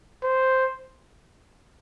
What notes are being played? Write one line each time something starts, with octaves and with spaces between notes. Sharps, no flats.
C5